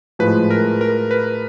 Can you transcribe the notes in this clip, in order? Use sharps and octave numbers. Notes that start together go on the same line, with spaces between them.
A2 F3 G#3 B4
A#4
A#4
B4